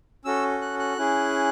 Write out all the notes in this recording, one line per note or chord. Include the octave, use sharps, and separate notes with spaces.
C#4 F#4 A4 E6
F#6
F#6
C#4 E4 G#4